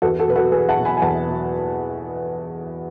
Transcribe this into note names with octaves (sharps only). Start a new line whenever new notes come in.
E2 F#4 A4
F#4 A4
B2 F#3 B4
F#4 A4
E2 G#4 B4
F#5 A5
B2 F#3
G#5 B5
G#5
E2 F#5 A5
B2 F#3